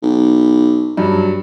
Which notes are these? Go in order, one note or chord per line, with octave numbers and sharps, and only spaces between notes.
B1
G2 F#3